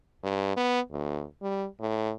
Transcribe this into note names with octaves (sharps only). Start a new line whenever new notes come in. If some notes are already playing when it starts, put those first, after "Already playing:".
G2
B3
D2
G3
A2